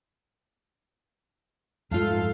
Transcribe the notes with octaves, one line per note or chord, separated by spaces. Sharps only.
F2 G#2 A3 F4 A4 F5